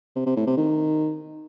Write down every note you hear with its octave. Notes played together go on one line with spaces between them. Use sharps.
C3
C3
A2
C3
D#3